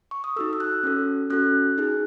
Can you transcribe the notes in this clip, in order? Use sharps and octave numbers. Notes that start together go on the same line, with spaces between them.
C#6
D#6
D#4 F#4 A4 E6
E6
F#6
C#4 F#4 A4
C#4 F#4 A4 F#6
D#4 G#4